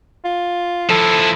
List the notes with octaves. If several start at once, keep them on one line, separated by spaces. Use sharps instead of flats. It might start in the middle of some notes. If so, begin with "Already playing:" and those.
F4
F3 E4 A4